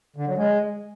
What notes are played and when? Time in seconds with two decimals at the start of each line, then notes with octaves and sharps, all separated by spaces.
0.16 D3
0.27 F#3
0.37 G#3